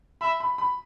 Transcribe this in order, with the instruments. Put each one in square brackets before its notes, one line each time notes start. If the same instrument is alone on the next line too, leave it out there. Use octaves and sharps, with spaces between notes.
[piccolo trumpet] E5 [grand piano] B5
[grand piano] B5
B5